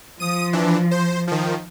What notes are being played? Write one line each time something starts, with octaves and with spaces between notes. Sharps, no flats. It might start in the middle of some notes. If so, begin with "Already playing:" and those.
F3 D#6 D#7
E3 D4
C5
D#3 F3